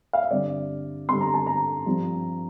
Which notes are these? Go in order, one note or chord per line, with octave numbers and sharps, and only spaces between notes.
F5
E5
G2 D3 G3 C4 D5
G2 D3 G3 C4 C6
A#5
A5
A#5
G2 F3 C4